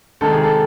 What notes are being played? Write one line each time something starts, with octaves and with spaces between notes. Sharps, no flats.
C3 D#3 G#3 A4
G#4
A4